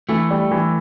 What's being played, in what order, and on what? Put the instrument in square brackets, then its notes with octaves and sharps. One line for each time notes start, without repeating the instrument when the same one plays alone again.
[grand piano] E3 [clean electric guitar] A3
[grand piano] G3
E3